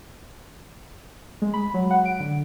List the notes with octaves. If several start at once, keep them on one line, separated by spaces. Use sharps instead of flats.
G#3
B5
F#3
F#5
D7
D3